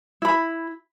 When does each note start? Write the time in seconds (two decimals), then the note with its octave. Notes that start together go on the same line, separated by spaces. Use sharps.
0.22 E4 B5